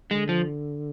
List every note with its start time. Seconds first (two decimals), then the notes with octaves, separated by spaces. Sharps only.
0.11 D3 G#3
0.29 F3